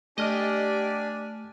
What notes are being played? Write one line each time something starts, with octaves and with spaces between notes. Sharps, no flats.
A3 D4 G4 D5 D#5 G#5 F6